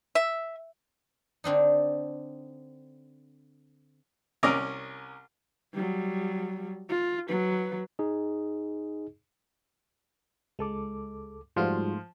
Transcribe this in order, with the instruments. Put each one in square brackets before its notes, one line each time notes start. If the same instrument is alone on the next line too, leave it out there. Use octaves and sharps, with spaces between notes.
[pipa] E5
[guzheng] D3 C4 D4 D#4
[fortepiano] C2 C#4 A#4 D5 D#5 A#5
[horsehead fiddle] F#3 G3
F4
F#3 B4
[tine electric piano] D#4 G#4 D#5
[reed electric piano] C#2 A4 D6 [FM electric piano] G#3
[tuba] G#2 [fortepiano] F3 [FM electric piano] G3 F4 F#4 [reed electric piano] A3 C6